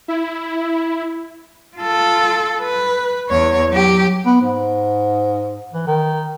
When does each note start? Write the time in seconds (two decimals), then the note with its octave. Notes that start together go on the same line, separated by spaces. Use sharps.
0.08 E4
1.77 F4 A4
2.62 B4
3.29 E2 C#5
3.70 F#3 G4
4.26 B3
4.42 G#2
5.73 E3
5.87 D#3